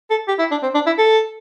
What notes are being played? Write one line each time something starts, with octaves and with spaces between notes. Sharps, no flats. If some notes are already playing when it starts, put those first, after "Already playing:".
A4
G4
E4
D4
C4
D4
E4
A4